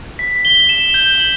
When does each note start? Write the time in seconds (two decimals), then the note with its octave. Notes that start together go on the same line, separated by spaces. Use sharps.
0.19 B6
0.45 G7
0.69 E7
0.94 G6
1.20 F#7